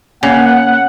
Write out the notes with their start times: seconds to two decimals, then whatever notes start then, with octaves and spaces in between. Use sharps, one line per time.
0.23 C#3 A#3 F#5